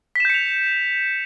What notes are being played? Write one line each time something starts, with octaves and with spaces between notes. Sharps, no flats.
G6 B6 C#7 E7 F7